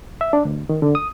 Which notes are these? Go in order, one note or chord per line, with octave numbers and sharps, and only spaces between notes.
E5
D4
D2
D#3
D3
D#6